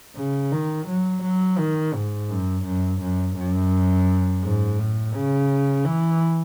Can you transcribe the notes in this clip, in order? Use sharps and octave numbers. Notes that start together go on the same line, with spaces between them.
C#3
D#3
F#3
F#3
D#3
G#2
F#2
F#2
F#2
F#2
G#2
A2
C#3
E3